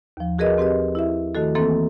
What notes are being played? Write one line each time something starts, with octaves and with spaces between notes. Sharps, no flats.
D#2 F3
F#4 G#4 A#4 B4 D#5
C4 G4 B4 D#5
E4 G4 E5
D#3 A3 F#4 A4
E3 A#3 C4 A4